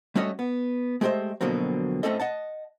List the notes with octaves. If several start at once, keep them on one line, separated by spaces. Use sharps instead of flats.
G3 A3 C#4 F#4 C#5 D#5
B3
G#3 A3 G4 C5 D#5 E5
F2 B2 D3 F#3 A#3 C4
A2 A3 C4 C#4 A4 D#5
D#5 F#5 A5